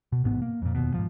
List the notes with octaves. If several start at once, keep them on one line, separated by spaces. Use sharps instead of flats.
B2
A1 G#2 B2 B3
A#3
F2 A#2
F1 D#2 B2
G#2 F3